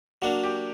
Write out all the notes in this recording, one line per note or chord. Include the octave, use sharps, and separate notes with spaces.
F#3 A#3 D4 F#4
G4